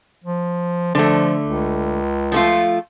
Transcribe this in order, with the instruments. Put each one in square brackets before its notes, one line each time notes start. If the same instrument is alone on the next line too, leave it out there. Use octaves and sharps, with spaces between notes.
[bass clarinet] F3
[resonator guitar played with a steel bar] D3 A3 [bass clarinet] F3
[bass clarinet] C#2
[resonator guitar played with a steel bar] F3 A3 F4